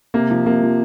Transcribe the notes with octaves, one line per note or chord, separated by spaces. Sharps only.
C3 A#3
F3
C3 A#3
F3